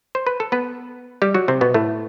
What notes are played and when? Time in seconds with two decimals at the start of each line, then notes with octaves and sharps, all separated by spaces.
0.15 C5
0.27 B4
0.40 A4
0.52 B3 B4
1.22 G3 G4
1.34 F#3 F#4
1.48 C3 C4
1.61 B2 B3
1.74 A2 A3